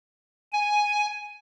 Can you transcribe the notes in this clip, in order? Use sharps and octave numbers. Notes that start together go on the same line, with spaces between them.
G#5